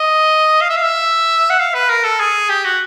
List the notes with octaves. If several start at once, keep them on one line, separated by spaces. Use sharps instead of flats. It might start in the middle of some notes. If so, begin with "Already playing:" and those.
Already playing: D#5
F5
E5
F5
E5
F#5
F5
B4
A#4
A4
G#4
G4
F#4